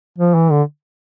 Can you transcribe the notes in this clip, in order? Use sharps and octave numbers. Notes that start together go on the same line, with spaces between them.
F3
E3
D3